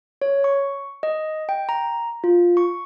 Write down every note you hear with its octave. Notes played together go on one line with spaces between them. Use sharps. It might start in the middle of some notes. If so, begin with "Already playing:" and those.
C#5
C#6
D#5
G5
A#5
F4
C#6